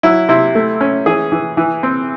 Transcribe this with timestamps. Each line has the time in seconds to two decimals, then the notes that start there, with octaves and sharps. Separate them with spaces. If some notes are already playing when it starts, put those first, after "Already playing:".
0.03 F#3 E4
0.29 C3 E4
0.55 A3
0.81 C#4
1.06 E3 G#4
1.32 E3
1.57 E3
1.83 C4